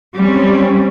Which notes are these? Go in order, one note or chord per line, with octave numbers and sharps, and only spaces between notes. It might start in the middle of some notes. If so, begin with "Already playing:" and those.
G3 C4 C#4